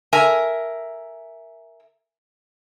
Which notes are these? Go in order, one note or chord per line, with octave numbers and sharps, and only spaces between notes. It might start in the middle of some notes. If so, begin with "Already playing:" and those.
A#4 E5 G#5